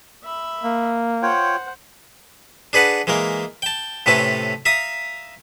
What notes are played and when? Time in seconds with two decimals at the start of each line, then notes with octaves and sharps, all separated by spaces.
0.24 E5 B5
0.64 A#3
1.23 F4 C5 C#5 F#5 G5
2.73 D4 G#4 B4 F#5 A5
3.07 E3 G#3 A#3 A#4
3.62 G5 A5
4.06 A2 C3 A3 C#4 B4 A5
4.65 E5 F5 A#5 D#6